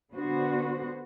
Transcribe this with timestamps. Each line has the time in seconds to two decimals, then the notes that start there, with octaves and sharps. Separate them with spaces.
0.12 D3 B3 F#4 C5